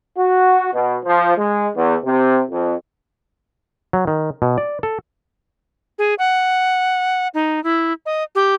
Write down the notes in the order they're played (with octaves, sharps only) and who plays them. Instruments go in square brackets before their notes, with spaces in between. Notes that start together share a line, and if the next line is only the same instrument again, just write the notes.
[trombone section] F#4
B2
F3
G#3
E2
C3
F2
[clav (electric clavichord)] F#3
D#3
B2
D5
A4
[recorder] G#4
F#5
D#4
E4
D#5
G4